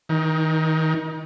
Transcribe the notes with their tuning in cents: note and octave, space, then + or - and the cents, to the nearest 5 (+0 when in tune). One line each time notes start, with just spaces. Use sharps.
D#3 +35 D#4 +0